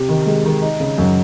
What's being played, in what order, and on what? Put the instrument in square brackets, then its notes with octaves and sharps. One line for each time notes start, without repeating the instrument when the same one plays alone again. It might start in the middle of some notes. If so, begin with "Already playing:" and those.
Already playing: [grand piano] C3
D#3
G#3
D#3
D#4
C#3
F#2